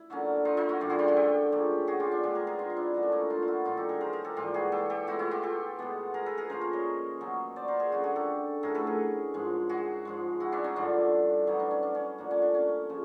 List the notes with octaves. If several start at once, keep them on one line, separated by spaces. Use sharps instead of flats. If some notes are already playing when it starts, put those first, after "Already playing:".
Already playing: E4
D3 F#3 A#3 C#4
D#4 F4
D#4 F4
E4 F#4
G2 D3 G3 F4 G4
F#4 G#4
F4 G4
F#4 G#4
G4 A4
C#3 F3 A#3 C#4
F#4 G#4
F4 G4
D4
B2 G#3 C4 F4 G4
G#4 A#4
G#4 A#4
D#4 F4
F4
D4 E4
D3 F3 A#3 C#4
D4
C#4 D#4
D#4 F4
F4
E4 F#4
G2 D#3 F#3 D#4 F4
G4 A4
G#4 A#4
A#4 C5
G#4 A#4
G4 A4
G#2 E3 G3 A#3 F4 G4
F#4 G#4
G4 A4
G4 A4
B2 G#3 C4 E4 F#4
E4 F#4
F4 G4
G4 A4
B2 G#3 B3
G#4 A#4
A4 B4
G#4 A#4
C#3 F3 A#3 C#4 A#4 C5
A#4 C5
C#5 D#5
B2 F#3 A#3 C#4
C5 D5
A#4 C5
G#4 A#4
D3 F#3 A#3 C#4 F#4 G#4
F#4 G#4
G4 A4
A2 F#3 A3 G#4 A#4
A4 B4
G#4 A#4
G#2 F3 G#3
F#4 G#4
G#2 F3 G#3
E4 F#4
D4 E4
C#4 D#4
G2 D3 F3 D4 E4
B2 F#3 B3 C#4 D#4
D4
C#4
D4
C#4
D3 F3 A#3 D4
C#4
D4
C#4
C#3 F3